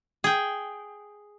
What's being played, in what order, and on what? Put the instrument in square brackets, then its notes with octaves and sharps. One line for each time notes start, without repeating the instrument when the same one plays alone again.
[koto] G#4 G5